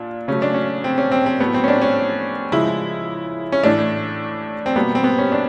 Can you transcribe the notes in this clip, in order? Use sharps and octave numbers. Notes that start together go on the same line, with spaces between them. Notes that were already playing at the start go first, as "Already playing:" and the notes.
Already playing: A#2 D4
C#3 F#3 A3 C#4
D4
C#4
C4
C#4
C4
C4
A2 F#3 A3 B3
C4
C#4
D4
C#4
C#3 F3 G#3 E4
C#4
A2 E3 A3 D4
C4
B2 G3 A#3 B3
C4
B3
C#4
D4